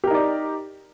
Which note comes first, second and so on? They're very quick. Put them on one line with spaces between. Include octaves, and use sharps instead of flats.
G4 A#4 D#4 D5